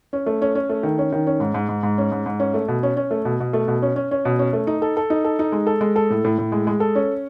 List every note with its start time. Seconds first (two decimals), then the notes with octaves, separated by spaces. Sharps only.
0.13 C#4
0.26 A3
0.42 C#4
0.55 C#4
0.69 A3
0.83 D#3
0.98 C#4
1.12 D#3
1.27 C#4
1.40 G#2
1.54 G#2
1.69 G#2
1.83 G#2
1.98 C#4
2.12 G#2
2.26 G#2
2.40 C#4
2.54 A3
2.68 B2
2.83 C#4
2.97 C#4
3.11 A3
3.25 B2
3.40 B2
3.53 A3
3.68 B2
3.82 C#4
3.96 C#4
4.11 C#4
4.25 B2
4.39 C#4
4.53 A3
4.67 D#4
4.82 A4
4.97 A4
5.10 D#4
5.24 A4
5.39 D#4
5.52 G#3
5.67 A4
5.81 G#3
5.96 A4
6.10 A2
6.25 A2
6.38 A2
6.52 G#3
6.67 G#3
6.80 A4
6.95 C#4